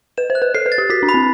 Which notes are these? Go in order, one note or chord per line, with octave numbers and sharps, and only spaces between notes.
B4 E7
C5
F#6
B4
A4 C7
B4
A6
G4
F#4 B6
D4
B5
C4